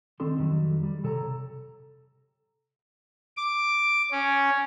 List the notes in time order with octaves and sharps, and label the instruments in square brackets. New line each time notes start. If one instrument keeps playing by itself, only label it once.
[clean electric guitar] D2 D#3 C4 D4 A4 C6
F2 D#3 F#3 G3
G3
C3 A4 C#5 A#5
[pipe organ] D6
C#4